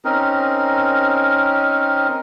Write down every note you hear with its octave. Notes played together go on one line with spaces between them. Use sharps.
C4 C#4 D#4 A#4